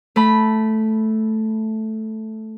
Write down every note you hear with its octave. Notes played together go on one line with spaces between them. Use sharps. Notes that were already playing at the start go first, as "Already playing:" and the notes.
A3 B5